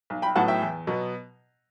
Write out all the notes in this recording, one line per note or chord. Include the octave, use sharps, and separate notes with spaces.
B1
G5 B5
A2 F#3 B3 F#5 A5
E5 G5
E2
B2 F#3 B3